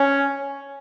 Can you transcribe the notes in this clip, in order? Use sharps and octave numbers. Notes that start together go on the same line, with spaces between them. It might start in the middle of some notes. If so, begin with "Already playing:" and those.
Already playing: C#4